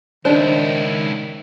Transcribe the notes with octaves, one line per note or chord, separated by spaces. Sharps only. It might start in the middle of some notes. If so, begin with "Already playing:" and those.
C#2 D#3 D4 E4 G4 C5